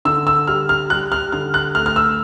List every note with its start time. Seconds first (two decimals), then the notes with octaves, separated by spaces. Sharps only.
0.05 D3 E6
0.27 E6
0.47 G3 F6
0.69 F6
0.90 G3 F#6
1.12 F6
1.33 D3 F6
1.54 F#6
1.75 A3 F6
1.86 F6
1.96 E6